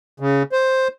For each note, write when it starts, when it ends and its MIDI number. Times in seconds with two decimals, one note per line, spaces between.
0.20 0.43 49
0.52 0.88 72